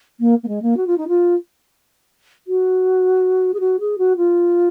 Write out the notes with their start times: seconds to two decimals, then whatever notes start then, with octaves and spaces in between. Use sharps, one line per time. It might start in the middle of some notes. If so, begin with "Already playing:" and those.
0.19 A#3
0.43 A#3
0.48 G#3
0.62 A#3
0.76 F#4
0.86 F4
0.97 D#4
1.08 F4
2.47 F#4
3.53 G#4
3.60 F#4
3.79 G#4
3.98 F#4
4.17 F4